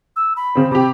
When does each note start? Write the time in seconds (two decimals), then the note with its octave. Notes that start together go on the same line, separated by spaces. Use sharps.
0.16 E6
0.36 B5
0.55 C#3 C4
0.71 C3 G4 B5